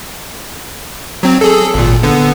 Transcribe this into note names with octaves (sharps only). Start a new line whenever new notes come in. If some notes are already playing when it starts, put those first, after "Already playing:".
F#3 C4
G#4 A4
G#1 A#2
D3 B3